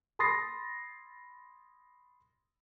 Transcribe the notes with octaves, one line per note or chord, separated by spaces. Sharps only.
B5 C6 D#6 A6 A#6 C7